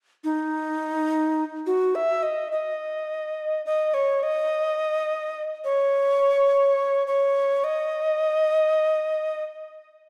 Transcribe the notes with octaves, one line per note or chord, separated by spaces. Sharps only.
D#4
F#4
E5
D#5
D#5
D#5
C#5
D#5
C#5
C#5
D#5